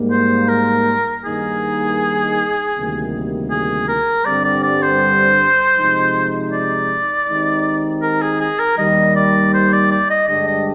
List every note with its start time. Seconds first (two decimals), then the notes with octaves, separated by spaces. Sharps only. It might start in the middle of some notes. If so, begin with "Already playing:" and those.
Already playing: G#2 G3 A#3
0.11 C5
0.49 A#4
1.24 G2 D#3 A#3 D#4 G#4
2.76 D2 C3 D#3 G3 A#3
3.51 G#4
3.89 A#4
4.25 G2 D3 G3 C4 D5
4.45 D5
4.63 D5
4.83 C5
5.77 C3 F3 G#3 D#4
6.52 D5
7.27 D#3 G#3 C4 D#4 G4
8.02 A#4
8.22 G#4
8.40 G#4
8.59 A#4
8.78 D#2 D#3 G3 D#5
9.16 D5
9.54 C5
9.73 D5
9.91 D5
10.10 D#5
10.28 G2 D3 G#3 D4 G4 D#5
10.47 D#5